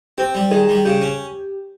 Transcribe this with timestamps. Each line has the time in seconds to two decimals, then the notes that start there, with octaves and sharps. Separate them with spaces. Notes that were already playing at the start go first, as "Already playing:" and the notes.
0.18 C4 G4
0.34 G3
0.51 D#3 G#4
0.69 G3
0.85 C#3 G4
1.02 C#4